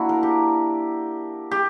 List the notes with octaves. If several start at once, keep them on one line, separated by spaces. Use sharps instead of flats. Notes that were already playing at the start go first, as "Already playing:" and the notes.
Already playing: A#3 D4 E4 F#4
A#4
G4
G4